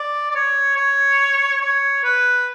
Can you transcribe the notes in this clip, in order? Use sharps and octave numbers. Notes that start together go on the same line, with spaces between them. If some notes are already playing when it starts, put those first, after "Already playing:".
Already playing: D5
D5
C#5
C#5
C#5
B4